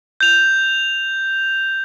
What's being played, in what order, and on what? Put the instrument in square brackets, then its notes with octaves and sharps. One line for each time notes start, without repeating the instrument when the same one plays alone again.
[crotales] G6 F7